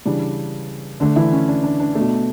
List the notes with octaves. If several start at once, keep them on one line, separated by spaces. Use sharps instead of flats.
C#3 E3 G3 D4
D3 A3 D4
E3 E4
C#4
D4
D4
D4
B2 A3